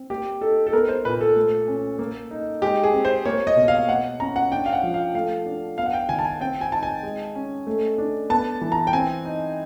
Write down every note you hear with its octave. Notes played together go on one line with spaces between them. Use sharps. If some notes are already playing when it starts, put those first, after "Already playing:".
Already playing: C4
A#3 G4
D#4 A4
A4
B3 A#4
C5
A#2 B4
A4
A3
C#4
A#3
D#4
G#3 G4
G#4
C4
C5
A#3 C#5
D#5
B2
F5
A#3 F#5
C#4 A#5
F#5
D4 G5
F5
F#5
F3
F5
A3 F5
D4
B3 F5
F#5
G5
D#3 G#5
A5
G#5
C4 G5
G#5
D#4 A5
G#5
G#3
C#4
A3
D4
B3 A5
E3
A#5
G5
C4 G#5
D#4